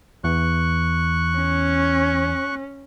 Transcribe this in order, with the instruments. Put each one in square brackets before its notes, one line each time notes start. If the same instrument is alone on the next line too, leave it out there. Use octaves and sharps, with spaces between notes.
[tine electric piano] E2 E3 [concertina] C#6 F#6
[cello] C#4